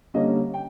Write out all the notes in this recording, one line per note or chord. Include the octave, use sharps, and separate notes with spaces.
D3 G3 A#3 C#4 D#5
G5